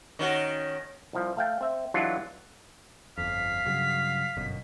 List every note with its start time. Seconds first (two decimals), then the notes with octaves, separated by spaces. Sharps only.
0.19 D#3 C#4 F#4
1.13 C2 F3
1.37 A3 F5 G5
1.61 C4 E5
1.94 E3 F#3 G#3 D4 F4
3.18 G1 F2 F5 B6
3.65 G2 C#3 F#3
4.37 G1 F#2 B2